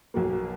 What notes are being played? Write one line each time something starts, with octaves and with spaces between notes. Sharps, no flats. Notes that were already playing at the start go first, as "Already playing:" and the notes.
B1 B2 A#3